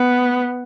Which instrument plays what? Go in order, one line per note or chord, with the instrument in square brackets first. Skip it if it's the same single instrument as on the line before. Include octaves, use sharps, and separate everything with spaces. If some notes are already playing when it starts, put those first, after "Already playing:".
Already playing: [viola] B3